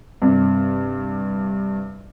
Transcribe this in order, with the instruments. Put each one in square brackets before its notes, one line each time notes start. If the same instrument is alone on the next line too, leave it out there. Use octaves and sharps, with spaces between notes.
[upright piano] G2 C3